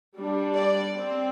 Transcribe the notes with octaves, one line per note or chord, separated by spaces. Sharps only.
G3 D4
D5
C4